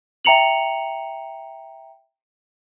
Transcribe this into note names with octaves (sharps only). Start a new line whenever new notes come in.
E5 G5 A#5 C#7 F7 F#7